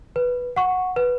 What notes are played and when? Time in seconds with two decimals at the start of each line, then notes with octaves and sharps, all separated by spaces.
0.16 B4
0.56 F#5 C#6
0.96 B4